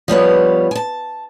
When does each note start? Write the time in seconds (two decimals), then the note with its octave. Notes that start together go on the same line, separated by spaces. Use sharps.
0.08 F3 G3 B3 C#5
0.71 G#5 A5